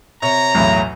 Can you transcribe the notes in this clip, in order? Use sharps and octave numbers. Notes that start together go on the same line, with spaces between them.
C3 C#5 A#5
B1 E2 A2